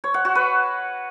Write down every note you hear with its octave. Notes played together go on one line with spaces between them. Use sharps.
C#5
F#5
F#4
B4